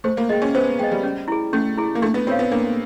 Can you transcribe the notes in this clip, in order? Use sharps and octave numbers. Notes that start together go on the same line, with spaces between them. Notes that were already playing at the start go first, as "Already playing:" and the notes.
A3 C5
A#3
G#3 D#5 G5
C#4
B3 C5
G#3 D#5 G5
G3
C#4
E4 G#4
A3 C#4
E4 G#4
A#3
A3 D4
B3
C4 F4 A4 C#5 F5
B3
A#3 D4